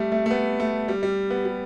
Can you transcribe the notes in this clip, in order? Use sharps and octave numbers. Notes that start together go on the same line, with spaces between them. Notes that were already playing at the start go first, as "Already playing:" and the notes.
Already playing: G3 A3
A3
A3
B3
A3
G3
G3
B3
G3